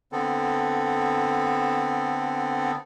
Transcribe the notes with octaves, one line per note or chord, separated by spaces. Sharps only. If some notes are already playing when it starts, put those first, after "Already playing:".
D3 B3 C4 A4